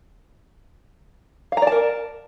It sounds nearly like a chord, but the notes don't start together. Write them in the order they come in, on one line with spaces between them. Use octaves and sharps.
F5 A#5 D5 A5 A#4